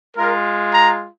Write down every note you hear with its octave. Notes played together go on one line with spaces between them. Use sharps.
G#3 F4 A#4
A#5